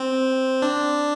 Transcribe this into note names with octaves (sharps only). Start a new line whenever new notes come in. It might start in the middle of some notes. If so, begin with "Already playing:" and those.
Already playing: C4
D4